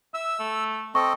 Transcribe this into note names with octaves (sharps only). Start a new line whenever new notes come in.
E5 E6
A3
C4 A4 D#5 C#6